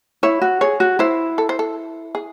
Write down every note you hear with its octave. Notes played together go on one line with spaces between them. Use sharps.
E4 C#5
F#4
G#4 C#5
F#4
E4 C5
A4
C5
A4
G#4